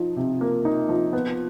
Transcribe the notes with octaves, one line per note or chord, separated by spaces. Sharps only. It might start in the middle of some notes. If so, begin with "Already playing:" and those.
Already playing: F3 D#4
C3
A#3
D#4
F3
B3